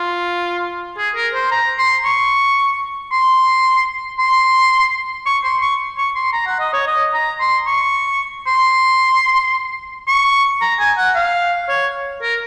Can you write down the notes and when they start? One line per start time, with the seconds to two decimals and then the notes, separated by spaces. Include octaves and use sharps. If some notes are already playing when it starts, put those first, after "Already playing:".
Already playing: F4
0.97 G#4
1.15 A#4
1.34 C5
1.51 A#5
1.78 C6
2.05 C#6
3.12 C6
4.19 C6
5.26 C#6
5.44 C6
5.62 C#6
5.97 C#6
6.15 C6
6.33 A#5
6.46 F#5
6.60 D#5
6.73 C#5
6.87 D#5
7.14 A#5
7.40 C6
7.67 C#6
8.47 C6
10.08 C#6
10.61 A#5
10.79 G#5
10.97 F#5
11.15 F5
11.69 C#5
12.22 A#4